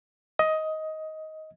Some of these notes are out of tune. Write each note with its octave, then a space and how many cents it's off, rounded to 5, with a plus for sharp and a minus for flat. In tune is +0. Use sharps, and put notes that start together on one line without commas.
D#5 +15